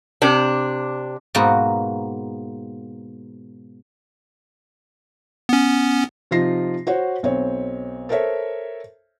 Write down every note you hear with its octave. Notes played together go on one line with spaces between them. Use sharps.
C3 D4
G#2 B2 A#3 B3 F#4
B3 C#4
C3 F3 D#4 F4 A#6 C7
F#4 C5 C#5 F#5
B1 C4 C#5
A4 A#4 C5 C#5 E5